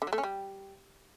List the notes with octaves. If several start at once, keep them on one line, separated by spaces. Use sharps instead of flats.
D3
F#3
A3
C#4
G3